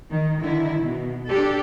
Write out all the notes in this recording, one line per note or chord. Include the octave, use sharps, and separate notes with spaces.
D#3
D3 D#3 E4
B2
D4 G4 A4